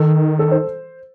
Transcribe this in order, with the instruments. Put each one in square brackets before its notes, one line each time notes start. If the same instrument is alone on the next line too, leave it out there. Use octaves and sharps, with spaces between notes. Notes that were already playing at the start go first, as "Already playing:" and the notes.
Already playing: [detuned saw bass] D#3 [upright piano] A4
[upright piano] A4
C5